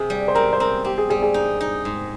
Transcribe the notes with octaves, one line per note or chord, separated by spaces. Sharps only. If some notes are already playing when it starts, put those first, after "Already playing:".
Already playing: C3 G#4
G3
C5
C4 A#4
C5
C4 A#4
C4 G4
G#4
G3 G#4
G#4
D#4
D#4
G#2